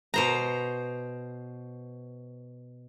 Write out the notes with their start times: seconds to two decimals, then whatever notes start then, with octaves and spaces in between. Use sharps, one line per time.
0.14 B2 C5 A#5